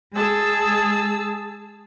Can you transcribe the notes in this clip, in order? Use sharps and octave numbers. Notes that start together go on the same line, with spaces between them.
G#3 G#4 A5 E6